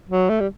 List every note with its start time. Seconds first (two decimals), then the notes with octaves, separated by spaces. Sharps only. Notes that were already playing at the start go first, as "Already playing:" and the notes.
0.09 F#3
0.29 A3
0.40 G3